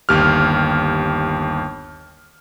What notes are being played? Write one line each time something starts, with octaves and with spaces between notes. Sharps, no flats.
G1 D#2 G4 F6